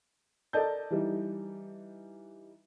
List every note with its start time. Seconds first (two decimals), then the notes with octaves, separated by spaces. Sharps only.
0.53 A4 A#4 D5 D#5 A5 G6
0.91 E3 G3 D#4